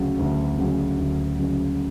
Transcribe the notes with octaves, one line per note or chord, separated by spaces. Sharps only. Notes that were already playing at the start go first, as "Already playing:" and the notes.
Already playing: D2 C#3 F#3
D2
C#3 F#3
D2
C#3 F#3